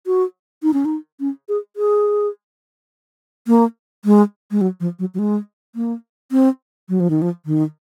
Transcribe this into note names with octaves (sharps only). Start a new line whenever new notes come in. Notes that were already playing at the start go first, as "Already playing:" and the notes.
F#4
D#4
C#4
D#4
C#4
G#4
G#4
A#3
G#3
G#3
F#3
F3
F#3
F#3
G#3
A#3
C4
F#3
F3
D#3
F3
D#3